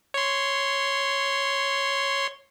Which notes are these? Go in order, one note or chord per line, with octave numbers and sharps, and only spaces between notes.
C#5 C6